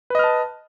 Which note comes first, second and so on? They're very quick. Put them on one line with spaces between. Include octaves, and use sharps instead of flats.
B4 D#5 F6 A5